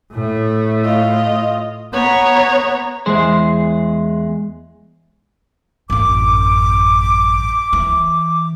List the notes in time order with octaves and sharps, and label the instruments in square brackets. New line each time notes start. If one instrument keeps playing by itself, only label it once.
[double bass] A2 A3
[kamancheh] F4 D#5
[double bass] B3 [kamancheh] C#5 A#5
[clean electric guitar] E2 E3 G#3 G#4 C5
[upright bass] A1 F#2 [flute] D6
[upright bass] E3